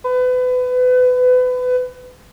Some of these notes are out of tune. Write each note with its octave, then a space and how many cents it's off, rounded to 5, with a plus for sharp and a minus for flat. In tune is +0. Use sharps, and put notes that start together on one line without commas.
B4 +30